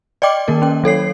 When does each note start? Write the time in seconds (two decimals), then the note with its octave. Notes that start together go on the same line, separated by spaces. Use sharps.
0.22 D5 D#5 G5 D6
0.48 D#3 A#3 A#4
0.62 C#4 G5
0.84 F#3 A4 C#5 C7